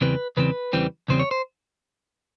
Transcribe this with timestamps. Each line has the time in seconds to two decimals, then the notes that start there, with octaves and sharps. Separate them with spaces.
0.01 E2 C#3 E3 G3 C4 B4
0.37 E2 C#3 E3 G3 C4 B4
0.73 E2 C#3 E3 G3 C4
1.08 E2 C#3 E3 G3 C4 C5
1.20 C#5
1.31 C5